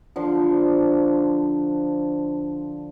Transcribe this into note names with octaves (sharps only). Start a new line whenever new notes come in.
D3 F3